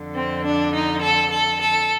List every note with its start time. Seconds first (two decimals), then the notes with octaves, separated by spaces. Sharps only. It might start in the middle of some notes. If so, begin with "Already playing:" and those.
Already playing: F2 D3
0.16 C4
0.44 D4
0.74 D#4
1.03 A4
1.31 A4
1.61 A4